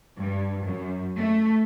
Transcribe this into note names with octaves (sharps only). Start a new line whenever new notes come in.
G2
F#2
A3